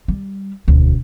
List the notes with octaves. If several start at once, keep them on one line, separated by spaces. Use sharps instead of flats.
G3
E1 D2